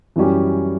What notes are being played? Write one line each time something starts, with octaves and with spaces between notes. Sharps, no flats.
F#2 E3 G3 C#4 G4